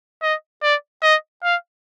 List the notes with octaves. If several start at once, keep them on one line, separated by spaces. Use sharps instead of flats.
D#5
D5
D#5
F5